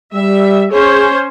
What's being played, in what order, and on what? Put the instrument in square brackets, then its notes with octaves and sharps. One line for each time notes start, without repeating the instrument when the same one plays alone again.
[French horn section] G3 [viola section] E5
[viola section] C#4 C5 C#5 [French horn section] G#4